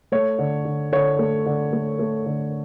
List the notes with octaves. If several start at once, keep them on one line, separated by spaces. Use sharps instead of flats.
A3 C#5
D3
D3
D3 C#5
A3
D3
A3
A3
D3